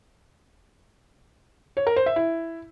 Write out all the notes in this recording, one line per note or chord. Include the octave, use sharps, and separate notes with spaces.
C#5
A#4
C5
E5
E4